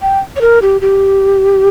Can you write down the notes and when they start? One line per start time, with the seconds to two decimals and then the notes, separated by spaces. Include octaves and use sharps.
0.02 G5
0.36 C#5
0.41 A#4
0.62 G4
0.81 G4